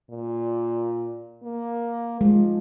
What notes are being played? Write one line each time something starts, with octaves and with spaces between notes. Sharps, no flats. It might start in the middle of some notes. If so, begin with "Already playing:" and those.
A#2
A#3
F3 G#3